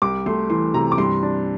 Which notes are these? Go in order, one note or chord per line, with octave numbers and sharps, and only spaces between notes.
C2 D6
A3 C6
E3 C6
C3 A#5
D6
G2 C6
D4